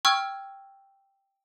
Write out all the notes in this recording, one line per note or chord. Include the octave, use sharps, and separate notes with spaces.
G5 C#6 E6 F6 G#6